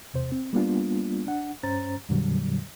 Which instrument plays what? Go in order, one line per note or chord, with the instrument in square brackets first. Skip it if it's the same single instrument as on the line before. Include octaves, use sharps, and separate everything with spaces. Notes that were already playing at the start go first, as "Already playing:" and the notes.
[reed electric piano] E2 C3 C5
C4
G3 A#3 B3 D4 F4
D4 F#5
G2 C#4 C5 A#5 A6
F2 A#2 D3 F#3 G3